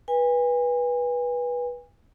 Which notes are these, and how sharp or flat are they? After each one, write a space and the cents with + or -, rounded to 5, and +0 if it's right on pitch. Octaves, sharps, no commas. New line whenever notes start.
B4 -15 G#5 -35